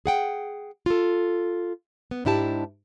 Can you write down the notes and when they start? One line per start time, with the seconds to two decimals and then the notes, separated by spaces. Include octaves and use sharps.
0.06 G#4 F#5 G5
0.86 F4 A4
2.11 B3
2.25 G#2 D4 E4 G4 A5